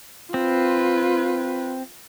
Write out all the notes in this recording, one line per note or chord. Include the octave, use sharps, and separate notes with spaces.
C4 F4 B4